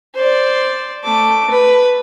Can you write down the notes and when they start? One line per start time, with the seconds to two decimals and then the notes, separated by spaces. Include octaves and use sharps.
0.15 C5 D5
1.04 A3 D6
1.51 B4